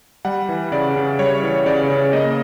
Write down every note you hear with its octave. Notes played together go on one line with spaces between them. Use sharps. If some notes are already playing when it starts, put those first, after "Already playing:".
G3 F#5
E3
C#3 D5
C#3
G3 C#5
E3
C#3 D5
C#3
A#3 D#5